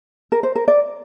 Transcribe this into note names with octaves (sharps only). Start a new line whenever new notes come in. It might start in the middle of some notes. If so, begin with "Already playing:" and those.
A#4
C5
A#4
D5